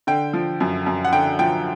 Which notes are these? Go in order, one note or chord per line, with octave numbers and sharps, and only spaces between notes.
D3 G5
F3
F#2
F#2
F#5
D3 G5
F3 G5